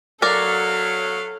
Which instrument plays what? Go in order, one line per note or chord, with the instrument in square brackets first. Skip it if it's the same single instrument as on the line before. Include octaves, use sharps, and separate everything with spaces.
[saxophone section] F#3 [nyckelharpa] A4 F5 [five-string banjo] A#4 D5